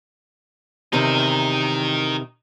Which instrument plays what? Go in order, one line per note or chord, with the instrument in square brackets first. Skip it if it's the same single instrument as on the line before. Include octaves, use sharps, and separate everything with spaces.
[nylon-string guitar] E2 C3 D#3 [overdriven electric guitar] D#4 A#4